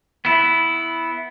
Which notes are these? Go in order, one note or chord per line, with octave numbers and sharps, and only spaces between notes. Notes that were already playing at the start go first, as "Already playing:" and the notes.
B3 E4